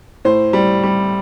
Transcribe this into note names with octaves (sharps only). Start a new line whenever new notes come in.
A2 C5
G3
G3